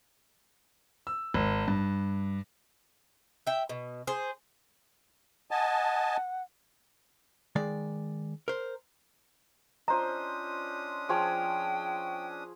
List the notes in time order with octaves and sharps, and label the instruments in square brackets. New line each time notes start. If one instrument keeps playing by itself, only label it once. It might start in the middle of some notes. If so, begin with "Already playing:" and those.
[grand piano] E6
G#1
G2
[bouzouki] E5 G5
B2
G#4 C5
[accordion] D#5 G#5 A5 [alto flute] F#5
[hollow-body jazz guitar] D#3 G#3 D5
A#4 C5
[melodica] C#4 D4 D#6 [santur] F4 C5 D#5 [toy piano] A#5
[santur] F3 G#4 C#5 [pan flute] G5